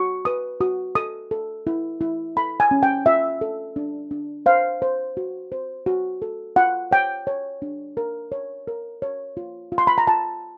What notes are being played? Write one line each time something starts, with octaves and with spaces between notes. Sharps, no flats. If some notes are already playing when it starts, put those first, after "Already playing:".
Already playing: F#4 C#6
B4 D#6
F#4 D#6
A4 D#6
A4
E4
E4
A4 B5
G#5
C#4
G5
F4 E5
A4
D4
D4
C5 F5
C5
F#4
C5
F#4
A4
F4 F#5
C#5 G5
C#5
D4
A#4
C#5
A#4
C#5
F4
F4
C6
B5
A#5
F4 A5